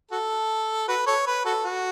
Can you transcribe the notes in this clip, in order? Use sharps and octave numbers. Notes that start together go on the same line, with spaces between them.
F#4 A4
F#4 B4
A4 C#5
B4
F#4 A4
F#4